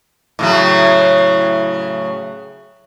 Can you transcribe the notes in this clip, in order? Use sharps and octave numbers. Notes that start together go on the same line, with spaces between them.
A2 C#3 F#3